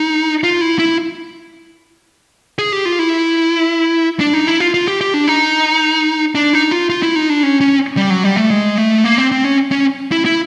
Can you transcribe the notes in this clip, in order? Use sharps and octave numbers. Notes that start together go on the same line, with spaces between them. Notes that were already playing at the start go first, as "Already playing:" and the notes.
Already playing: D#4
F4
E4
E4
G#4
G4
F4
E4
D4
D#4
E4
F4
F4
G4
G4
D4
D#4
D4
D#4
F4
F4
E4
D#4
D4
C#4
C#4
G3
F#3
G3
A3
G#3
A3
A#3
C4
C4
C#4
C#4
E4
E4